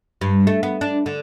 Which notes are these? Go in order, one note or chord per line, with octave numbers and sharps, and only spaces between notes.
G2
A3
B3
D4
D3